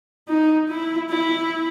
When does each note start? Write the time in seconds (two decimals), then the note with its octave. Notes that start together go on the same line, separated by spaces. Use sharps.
0.28 D#4
0.68 E4
1.09 E4